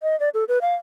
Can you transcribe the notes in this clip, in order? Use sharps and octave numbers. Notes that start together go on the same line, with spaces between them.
D#5
D5
A4
B4
F5